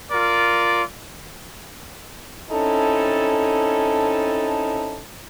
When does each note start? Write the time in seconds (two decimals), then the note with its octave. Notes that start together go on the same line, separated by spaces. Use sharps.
0.12 F4 A#4 D5
2.51 C4 C#4 D#4 E4 A4